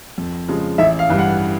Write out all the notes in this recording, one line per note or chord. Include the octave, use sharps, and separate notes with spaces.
F2
C#3 F3 G#3
A1 E5
F5
G2 E3
F#5